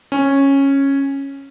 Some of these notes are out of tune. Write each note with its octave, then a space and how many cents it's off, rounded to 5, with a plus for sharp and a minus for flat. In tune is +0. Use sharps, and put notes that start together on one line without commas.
C#4 -10